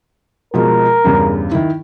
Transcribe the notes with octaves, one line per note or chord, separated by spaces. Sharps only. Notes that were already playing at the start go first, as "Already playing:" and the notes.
B2 F3 G#3 A#4
E2 G2 C#3
D#3 E4